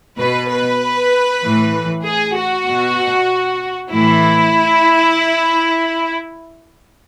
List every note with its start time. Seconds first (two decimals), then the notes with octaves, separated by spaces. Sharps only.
0.18 B2 B4
0.49 B4
1.42 A2 E3
2.05 G#4
2.36 F#4
2.66 B2
3.91 A2 E3 E4